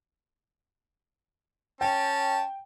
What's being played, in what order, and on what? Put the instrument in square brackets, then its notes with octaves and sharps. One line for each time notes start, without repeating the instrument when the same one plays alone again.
[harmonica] C#4 A5 [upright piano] G5